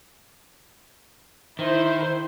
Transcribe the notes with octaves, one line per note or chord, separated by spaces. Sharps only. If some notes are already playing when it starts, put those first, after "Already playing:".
D#3 E4 C5